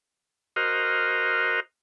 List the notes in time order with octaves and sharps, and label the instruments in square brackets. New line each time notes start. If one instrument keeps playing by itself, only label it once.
[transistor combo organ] F#4 A#4 C5 D#5 F6